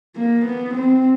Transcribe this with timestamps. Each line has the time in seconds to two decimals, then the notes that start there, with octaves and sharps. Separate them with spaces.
0.17 A#3
0.46 B3
0.75 C4